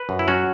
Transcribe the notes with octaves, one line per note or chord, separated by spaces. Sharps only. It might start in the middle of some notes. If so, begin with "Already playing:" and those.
Already playing: B4
F#2
E4
F#3 C#4 F#4